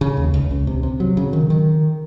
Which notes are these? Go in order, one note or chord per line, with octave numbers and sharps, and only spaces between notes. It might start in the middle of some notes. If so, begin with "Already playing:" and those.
C#3
D#2
C#2
C#2
C3
C3
F#3
C#3
D#3
D#3